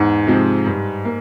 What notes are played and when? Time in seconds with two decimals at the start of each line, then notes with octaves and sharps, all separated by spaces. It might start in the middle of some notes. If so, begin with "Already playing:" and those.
Already playing: E2 G#2
0.27 C3 F3 G#3 C4
0.66 G2
1.05 A#3